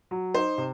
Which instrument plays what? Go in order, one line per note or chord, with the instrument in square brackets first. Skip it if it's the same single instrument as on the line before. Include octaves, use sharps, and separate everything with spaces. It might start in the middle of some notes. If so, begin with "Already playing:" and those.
[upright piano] F#3
[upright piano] D#4 [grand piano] C5
[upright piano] C3